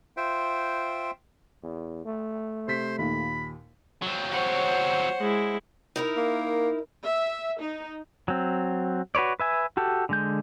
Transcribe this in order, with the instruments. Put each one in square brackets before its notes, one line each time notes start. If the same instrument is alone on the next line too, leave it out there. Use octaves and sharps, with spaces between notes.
[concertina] F4 C5 E5 G5
[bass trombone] E2
A3
[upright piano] C3 B6 [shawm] C5
[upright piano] D#2 A#2 [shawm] B5
[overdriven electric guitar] F#3 C4
[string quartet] C5 F#5 [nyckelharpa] C#5
[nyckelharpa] G#3 E4
[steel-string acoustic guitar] D#4 E4 A#4
[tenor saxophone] A#3
[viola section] E5
D#4
[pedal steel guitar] F#3 C4
F#4 B4 C#5 D5
B4 E5 G#5
F#4 G4 A4
D3 G#3 G6